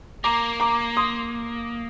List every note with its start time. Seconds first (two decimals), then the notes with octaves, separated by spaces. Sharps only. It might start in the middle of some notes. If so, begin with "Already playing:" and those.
0.24 A#3 A#5 D6
0.60 A#5 D6
0.97 C6 D#6